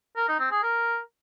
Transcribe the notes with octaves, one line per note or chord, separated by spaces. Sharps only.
A#4
D#4
C4
G#4
A#4